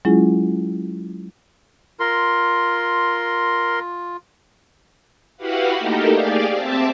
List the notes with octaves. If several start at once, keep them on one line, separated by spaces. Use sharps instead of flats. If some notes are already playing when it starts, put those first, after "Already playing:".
F#3 G#3 C#4 E4 F4 G#4
F4 A#4 C6
E4 F#4 G4 B4 F5 F#5
A3 A#3 D#4 G4 A4 A#4
G4 G#4 D5 F5
C4 E5 A5 D6